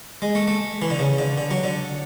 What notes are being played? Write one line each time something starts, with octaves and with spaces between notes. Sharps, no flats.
G#3
A3
A3
E3
D3
C#3
D3
D3
F#3
D3